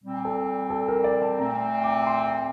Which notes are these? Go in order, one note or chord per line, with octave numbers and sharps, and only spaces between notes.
A#2 G3 C4
A4
A4
A#4
D5
A5
A#2 A3 C4 A#5
D6
C6